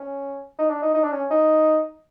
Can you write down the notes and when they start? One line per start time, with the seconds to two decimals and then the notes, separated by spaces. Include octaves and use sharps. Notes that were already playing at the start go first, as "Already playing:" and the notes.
Already playing: C#4
0.58 D#4
0.70 D4
0.82 D#4
0.94 D#4
1.04 D4
1.12 C#4
1.30 D#4